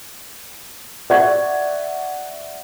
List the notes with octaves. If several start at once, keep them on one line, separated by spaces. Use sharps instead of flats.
D5 E5 F#5 C#6 G#6